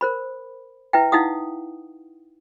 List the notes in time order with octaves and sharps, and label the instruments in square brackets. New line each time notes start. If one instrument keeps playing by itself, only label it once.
[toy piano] A#4 C5 B5
E4 B4 E5 G5
D#4 E4 F5 F#5 D#6